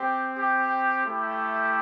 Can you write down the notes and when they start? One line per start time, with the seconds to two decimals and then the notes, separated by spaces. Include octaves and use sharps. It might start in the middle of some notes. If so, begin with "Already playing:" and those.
Already playing: C4 G4
0.37 G4
1.04 A3 E4 G4